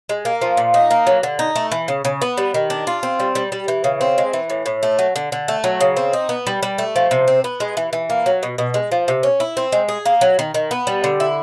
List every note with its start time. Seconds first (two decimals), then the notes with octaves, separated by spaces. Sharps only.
0.09 G#3
0.25 A#3
0.42 F3
0.57 A#2
0.74 D#4
0.91 A#3
1.07 F#3
1.23 D3
1.39 D#4
1.56 A3
1.72 E3
1.88 C#3
2.05 C#3
2.22 B3
2.37 G3
2.54 D#3
2.70 D4
2.87 F4
3.03 C4
3.20 G3
3.35 G3
3.52 G3
3.68 E3
3.84 C#3
4.01 C4
4.18 G#3
4.33 E3
4.50 A2
4.66 A2
4.83 A3
4.99 F#3
5.16 D3
5.32 D3
5.48 A3
5.64 F#3
5.81 C#3
5.97 C4
6.13 D#4
6.29 B3
6.47 G3
6.63 G3
6.78 A3
6.96 F3
7.11 C3
7.28 C4
7.44 B3
7.60 G#3
7.77 E3
7.93 E3
8.10 A#3
8.26 F#3
8.43 B2
8.58 B2
8.74 G#3
8.91 F3
9.08 C3
9.23 C#4
9.40 E4
9.57 C4
9.72 G#3
9.89 G#4
10.06 A#3
10.21 F#3
10.39 D#3
10.54 D#3
10.71 B3
10.87 G3
11.04 D3
11.20 E4